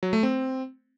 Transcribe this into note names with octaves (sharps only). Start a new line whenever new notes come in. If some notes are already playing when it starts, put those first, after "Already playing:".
F#3
A3
C4